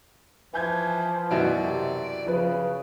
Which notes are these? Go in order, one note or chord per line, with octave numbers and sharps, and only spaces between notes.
E3 F3 G#5 G6 G#6
F#2 B2 E3 D5 E5
C3
C#3 F3 B4